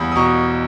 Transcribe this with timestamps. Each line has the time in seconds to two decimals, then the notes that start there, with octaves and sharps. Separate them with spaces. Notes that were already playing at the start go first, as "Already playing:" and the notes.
Already playing: E2 G3 B5 D#6
0.12 D#6
0.16 B2 A#5 C#6